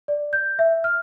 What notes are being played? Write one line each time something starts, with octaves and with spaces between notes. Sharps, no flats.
D5
G6
E5
F6